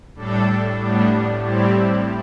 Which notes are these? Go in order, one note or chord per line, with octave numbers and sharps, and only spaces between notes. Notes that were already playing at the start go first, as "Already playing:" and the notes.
A2 G3 D4 A4
A2 G3 B3 D4
A2 G3 C4 E4 G4